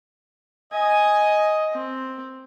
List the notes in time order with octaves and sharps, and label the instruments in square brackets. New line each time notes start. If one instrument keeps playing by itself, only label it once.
[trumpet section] D#5 [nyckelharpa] G#5
[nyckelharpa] C4